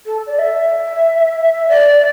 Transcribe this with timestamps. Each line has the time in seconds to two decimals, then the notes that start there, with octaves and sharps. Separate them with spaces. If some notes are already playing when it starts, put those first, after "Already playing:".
0.06 A4
0.27 D5
0.39 E5
1.69 D5